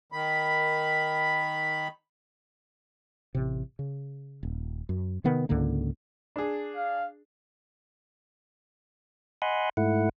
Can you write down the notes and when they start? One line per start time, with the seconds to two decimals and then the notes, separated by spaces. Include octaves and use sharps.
0.12 D#3 B5
3.35 A1 C3
3.79 C#3
4.43 D#1
4.89 F#2
5.24 C3 D#3 B3
5.49 C#2 G#2 D3 A#3
6.36 D4 G#4
6.76 F5
9.42 D#5 F#5 G#5 B5 C6
9.77 G#2 A3 E4 F#5